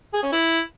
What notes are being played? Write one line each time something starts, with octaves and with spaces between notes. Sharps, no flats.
G#4
C#4
E4